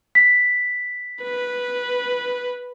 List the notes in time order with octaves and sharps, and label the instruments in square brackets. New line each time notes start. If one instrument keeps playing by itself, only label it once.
[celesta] B6
[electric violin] B4